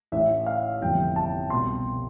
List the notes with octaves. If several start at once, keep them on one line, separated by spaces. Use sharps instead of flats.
A1 A2 E3 E5
F5
G1 F2 C3 E3 G5
A5
C2 B2 C6